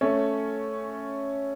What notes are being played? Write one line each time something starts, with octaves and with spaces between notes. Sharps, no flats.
A3 C#4